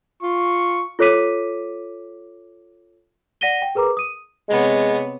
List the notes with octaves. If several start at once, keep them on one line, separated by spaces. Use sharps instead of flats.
F4 C#6
F4 A4 C#5 D6 B6 D#7
D5 F#5 A#6 B6 D#7 G7
G5
G#4 A#4 B4 A#5 D6
D#6 D#7
C3 G#3 B3 C#5